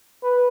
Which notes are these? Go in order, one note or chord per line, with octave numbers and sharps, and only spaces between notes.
B4